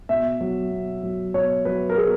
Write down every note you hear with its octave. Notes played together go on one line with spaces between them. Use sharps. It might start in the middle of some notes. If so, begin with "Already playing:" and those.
B2 E5
F#3
B2
F#3
B2 C#5
F#3 B4
A#4
B2 G#4